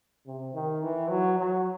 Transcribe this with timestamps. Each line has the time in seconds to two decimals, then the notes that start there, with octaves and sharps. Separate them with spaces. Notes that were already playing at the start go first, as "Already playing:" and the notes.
0.26 C3
0.54 D#3
0.82 E3
1.10 F#3
1.38 F#3